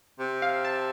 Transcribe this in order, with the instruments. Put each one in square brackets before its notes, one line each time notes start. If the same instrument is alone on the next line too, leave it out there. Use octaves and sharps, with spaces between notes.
[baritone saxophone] C3
[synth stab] F5
A5